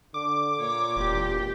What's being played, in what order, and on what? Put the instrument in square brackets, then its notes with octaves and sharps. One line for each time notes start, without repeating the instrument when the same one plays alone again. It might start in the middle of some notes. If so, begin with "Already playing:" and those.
[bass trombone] D3 [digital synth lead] D6
[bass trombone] A#2 [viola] C#5
[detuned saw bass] E1 [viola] G4